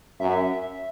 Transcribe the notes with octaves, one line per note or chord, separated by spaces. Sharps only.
F#2 E5